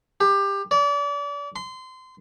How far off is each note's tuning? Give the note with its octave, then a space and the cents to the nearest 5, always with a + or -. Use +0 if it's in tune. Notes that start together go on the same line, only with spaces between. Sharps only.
G4 +20
D5 -35
C6 -25